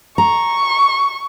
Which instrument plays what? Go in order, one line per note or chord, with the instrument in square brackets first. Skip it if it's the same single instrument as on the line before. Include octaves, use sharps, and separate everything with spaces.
[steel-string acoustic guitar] A#5 [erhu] C#6